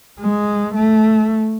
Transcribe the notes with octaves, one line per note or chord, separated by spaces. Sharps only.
G#3
A3